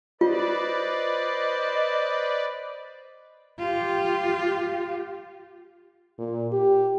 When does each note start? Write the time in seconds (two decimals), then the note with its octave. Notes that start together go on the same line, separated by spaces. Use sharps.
0.21 F4 B4 C5 D5 D#5
3.59 F4 G4
6.19 A#2
6.52 G4